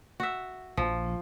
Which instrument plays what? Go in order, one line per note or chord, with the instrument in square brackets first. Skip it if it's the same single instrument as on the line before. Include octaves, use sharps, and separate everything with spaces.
[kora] F#4 E5
[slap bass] A#1 [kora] F3